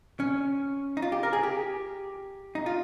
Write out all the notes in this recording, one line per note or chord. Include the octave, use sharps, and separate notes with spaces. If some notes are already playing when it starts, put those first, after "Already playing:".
C#4
D#4
F4
G4
A#4
G#4
G4
D#4
F4